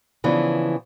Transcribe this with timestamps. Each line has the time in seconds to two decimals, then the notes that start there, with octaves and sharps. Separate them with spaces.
0.24 C#3 E3 F3 B3 D4